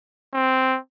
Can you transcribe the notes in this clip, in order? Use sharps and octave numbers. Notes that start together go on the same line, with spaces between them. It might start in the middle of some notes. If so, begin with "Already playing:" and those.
C4